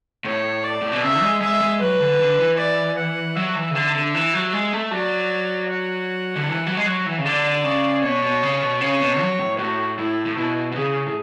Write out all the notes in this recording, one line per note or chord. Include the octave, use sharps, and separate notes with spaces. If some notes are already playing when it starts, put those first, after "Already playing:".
A2 C#5
D5
A2
B2
C#3 E5
G#3
G#3 E5
G#3
F#3 B4
D3
D3
E3
D5
F#5
F#3 E5
E3
C#3
D3
D3
E3
F#3
G#3
A3
F#3 D5
F#5
D3
E3
F#3
G#3
F#3
E3
C#3
D3 D5
C#3
B2 C#5
B2
C#3
B2
C#3 C#5
B2
F#3
A2
A2 F#4
A2 E4
A2
B2 E4
B2
C#3 G#4
A2